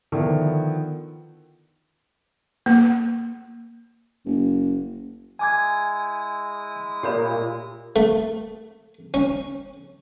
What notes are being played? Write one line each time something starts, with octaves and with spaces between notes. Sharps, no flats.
D3 D#3 F3 B3 E4
A#3
F#1
G#3 E4 G#5 D6 D#6 G#6
A#2 G4 C#5 B5
A3
C#4